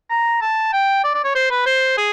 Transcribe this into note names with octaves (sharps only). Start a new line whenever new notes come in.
A#5
A5
G5
D5
D5
C#5
C5
B4
C5
G#4